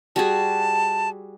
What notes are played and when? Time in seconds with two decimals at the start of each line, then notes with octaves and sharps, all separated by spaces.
0.16 G3 F#4 G#4 A5